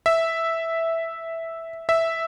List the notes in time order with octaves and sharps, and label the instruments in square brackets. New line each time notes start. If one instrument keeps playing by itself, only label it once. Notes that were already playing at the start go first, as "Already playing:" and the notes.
[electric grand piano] E5
E5